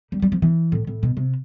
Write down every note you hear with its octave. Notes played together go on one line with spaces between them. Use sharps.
G3
G3
F3
E3
A2
A2
B2
C3